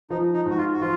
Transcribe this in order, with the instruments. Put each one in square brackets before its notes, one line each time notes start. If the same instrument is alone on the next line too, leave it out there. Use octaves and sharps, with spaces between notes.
[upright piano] F3 [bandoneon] D#4
[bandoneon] D#4
[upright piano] G#2 [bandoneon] F#4
[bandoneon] F4
F#4
[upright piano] F3 [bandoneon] F4